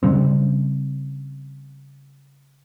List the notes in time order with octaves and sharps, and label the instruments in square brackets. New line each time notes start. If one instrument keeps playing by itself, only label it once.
[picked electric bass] C#3 G3 C4